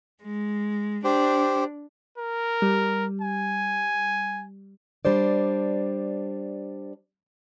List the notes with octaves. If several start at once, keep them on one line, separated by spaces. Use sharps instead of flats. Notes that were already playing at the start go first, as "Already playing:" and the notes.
G#3
D4 G4 C5
A#4
G3
G#5
G3 D4 C5 D5